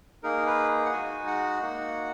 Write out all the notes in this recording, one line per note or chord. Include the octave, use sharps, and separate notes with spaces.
A#3 D#4 G#4 A#4
B4
F#5
G#3 D#4 F#4 G#5
F#5
A#3 D#4 F#4